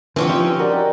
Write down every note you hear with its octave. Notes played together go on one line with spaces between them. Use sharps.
D3 E3 F3 C4 C#4 G4
F3 D#4
F#4 A#4 D5
G5